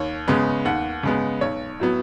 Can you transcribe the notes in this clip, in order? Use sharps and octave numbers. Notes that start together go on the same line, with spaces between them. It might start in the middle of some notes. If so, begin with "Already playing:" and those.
Already playing: D#2 C#5
C#3 G#3 B3
D#2 F#5
C#3 G#3 B3
B1 C#5
A2 F#3 B3